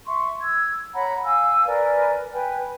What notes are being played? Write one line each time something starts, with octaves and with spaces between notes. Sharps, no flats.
E5 C6 C#6
E6 G#6
C#5 F#5 A#5 B5
F5 G#5 E6
A#4 B4 D5 G#5
B4 G5 G#5